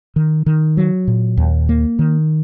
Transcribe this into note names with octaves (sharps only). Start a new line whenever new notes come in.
D#3
D#3
F#3
A#2
D#2
A#3
D#3